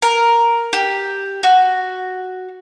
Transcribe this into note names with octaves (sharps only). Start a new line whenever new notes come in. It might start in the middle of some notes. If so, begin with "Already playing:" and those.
A#4
G4
F#4